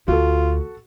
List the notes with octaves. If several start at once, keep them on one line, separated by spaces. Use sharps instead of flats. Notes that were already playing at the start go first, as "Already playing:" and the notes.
D2 F4 F#4 A4